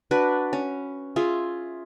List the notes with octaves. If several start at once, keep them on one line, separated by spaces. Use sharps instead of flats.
D4 F#4 B4 D5
C#4
F4 G#4 E5